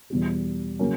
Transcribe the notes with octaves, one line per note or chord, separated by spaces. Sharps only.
E2 B2 G3
C#3 F#3 A#3 C#4